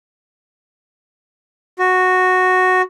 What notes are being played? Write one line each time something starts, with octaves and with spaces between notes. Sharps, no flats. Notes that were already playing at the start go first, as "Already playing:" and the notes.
F#4